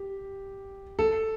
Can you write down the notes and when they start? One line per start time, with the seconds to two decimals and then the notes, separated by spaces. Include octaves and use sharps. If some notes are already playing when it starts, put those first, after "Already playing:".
Already playing: G4
0.99 A4